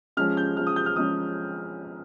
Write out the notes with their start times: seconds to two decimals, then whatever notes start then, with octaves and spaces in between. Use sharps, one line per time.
0.17 F3 G#3 C#4 F6
0.37 G6
0.56 F3 G#3 C#4 F6
0.67 D#6
0.76 G6
0.86 F6
0.96 F3 G#3 C#4 D#6